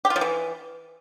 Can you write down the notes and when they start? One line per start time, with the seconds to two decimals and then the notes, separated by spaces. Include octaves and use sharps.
0.05 G4
0.10 F4
0.16 F3
0.21 E3